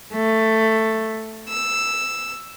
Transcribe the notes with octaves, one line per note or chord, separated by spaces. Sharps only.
A3
E6